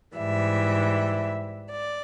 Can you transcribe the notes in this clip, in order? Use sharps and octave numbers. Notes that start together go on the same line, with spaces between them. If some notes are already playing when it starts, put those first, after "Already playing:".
G#2 E3 G3 E5
D5